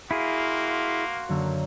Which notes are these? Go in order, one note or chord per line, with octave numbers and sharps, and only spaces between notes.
A#3 E4 F#4 G#4 F5 C6
F#2 D3 A#3